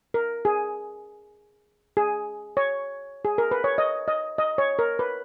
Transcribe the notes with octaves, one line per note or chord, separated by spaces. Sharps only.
A#4
G#4
G#4
C#5
G#4
A#4
B4
C#5
D#5
D#5
D#5
C#5
A#4
B4